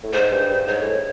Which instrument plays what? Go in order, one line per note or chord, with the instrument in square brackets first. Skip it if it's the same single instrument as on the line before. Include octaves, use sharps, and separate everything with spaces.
[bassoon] A2
[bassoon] G#2 [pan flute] C5
[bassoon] G2
G2
[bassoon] G#2 [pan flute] C#5
[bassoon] A2